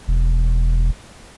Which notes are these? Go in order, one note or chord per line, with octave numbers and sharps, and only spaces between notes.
E1